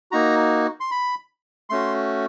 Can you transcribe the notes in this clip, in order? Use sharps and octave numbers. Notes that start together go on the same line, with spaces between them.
A#3 D#4 F#4 A#5
C6
B5
A3 C#4 F#4 C6